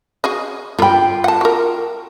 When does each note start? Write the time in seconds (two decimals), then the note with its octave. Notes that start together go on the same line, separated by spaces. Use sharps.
0.24 F#4 G#4 D#5
0.79 D3 F4 G5 B5
1.24 F#5 A5
1.41 F#4 A#4